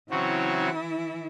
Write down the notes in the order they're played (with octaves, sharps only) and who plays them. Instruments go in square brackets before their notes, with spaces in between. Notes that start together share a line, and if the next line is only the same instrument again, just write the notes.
[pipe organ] C#3 F#3 C4 F#4 C#5 [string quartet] E3 E4